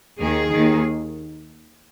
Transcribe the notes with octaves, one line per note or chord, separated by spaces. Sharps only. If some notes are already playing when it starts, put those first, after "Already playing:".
D#2 D#3 G#4
D#2 D#3